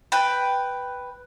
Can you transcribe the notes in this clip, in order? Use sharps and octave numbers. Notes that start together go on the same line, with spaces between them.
B4 G5